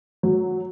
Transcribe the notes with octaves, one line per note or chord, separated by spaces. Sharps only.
F#3